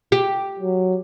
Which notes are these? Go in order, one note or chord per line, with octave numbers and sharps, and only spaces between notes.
G4
F#3